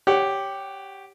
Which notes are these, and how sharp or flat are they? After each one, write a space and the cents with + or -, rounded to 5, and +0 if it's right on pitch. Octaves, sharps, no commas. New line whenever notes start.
G4 +0 C#5 +0 F#5 +25